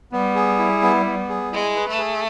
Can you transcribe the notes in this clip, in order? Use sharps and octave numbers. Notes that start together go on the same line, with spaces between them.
G3 B3
G#4
E4
B3
B3
G#4
G#3 E4
B4
A3
G#4